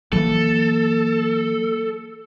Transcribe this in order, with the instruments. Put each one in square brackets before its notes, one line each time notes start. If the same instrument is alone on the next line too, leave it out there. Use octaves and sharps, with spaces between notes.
[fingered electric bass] E3 F#3 [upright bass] A#3 [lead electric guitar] A4